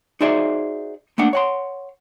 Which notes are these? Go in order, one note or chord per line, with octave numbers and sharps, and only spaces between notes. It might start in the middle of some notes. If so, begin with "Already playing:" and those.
D#4 F#4 G#4 C5 D5 E5
A3 A#3 D4 F#5
C#5 F#5 C6